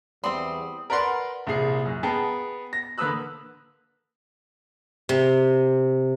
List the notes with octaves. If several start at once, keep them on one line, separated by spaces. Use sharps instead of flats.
E2 G3 C4 C6 D#6 F#7
A#4 B4 D5 F#5 C6
C2 A#2 G#4 C7
F#2
B3 G#4 G5 A5 A#5
A#6
D3 A#3 B4 D#6 E6 F#6
C3